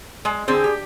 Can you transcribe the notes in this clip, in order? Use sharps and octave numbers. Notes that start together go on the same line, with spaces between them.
G#3
D3 C4 G#4 C5
G4